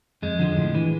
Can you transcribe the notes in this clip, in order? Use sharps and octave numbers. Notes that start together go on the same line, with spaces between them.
F2 G#3
D3 F3
A2
E3